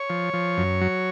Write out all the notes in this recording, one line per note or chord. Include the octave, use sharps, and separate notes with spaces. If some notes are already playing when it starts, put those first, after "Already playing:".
Already playing: C#5
F3
F3
F#2
F#3